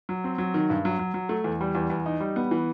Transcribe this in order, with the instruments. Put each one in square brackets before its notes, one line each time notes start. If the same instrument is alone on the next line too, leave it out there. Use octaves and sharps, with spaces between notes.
[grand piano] F#3
C4
F#3
D#3
G2
F#3
F#3
F#3
A3
E2
G3
E2
E2
D#4
G3
B3
E3